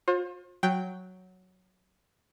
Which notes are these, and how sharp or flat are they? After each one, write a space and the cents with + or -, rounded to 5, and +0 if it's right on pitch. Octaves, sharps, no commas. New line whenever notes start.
F4 +40 C5 +35
F#3 +0 G5 +0